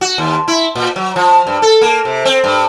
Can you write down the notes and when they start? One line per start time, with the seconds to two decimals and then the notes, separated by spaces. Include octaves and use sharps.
0.01 F#4
0.18 D#2
0.48 E4
0.75 A#2
0.96 F#3
1.16 F3
1.47 G2
1.62 A4
1.81 A#3
2.05 C3
2.25 C4
2.44 G2